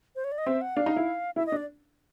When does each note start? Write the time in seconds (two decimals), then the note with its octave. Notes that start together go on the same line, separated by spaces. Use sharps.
0.16 C5
0.24 C#5
0.32 D5
0.38 D#5
0.46 C4 E5
0.61 F#5
0.76 D4 F5
0.86 D#4
0.96 E4
1.36 E4 E5
1.46 D#5
1.52 D4
1.57 D5